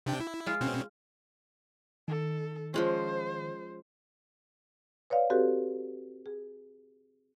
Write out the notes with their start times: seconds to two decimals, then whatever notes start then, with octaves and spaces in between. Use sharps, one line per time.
0.06 C3 D4 G5
0.20 E4
0.46 G#3 F4
0.61 B2 C4 C#4
2.08 D#3 A4
2.74 F3 G#3 C#4 C5
5.10 B4 C#5 D5 F5
5.30 C4 F#4 G4 A4 B4
6.26 G#4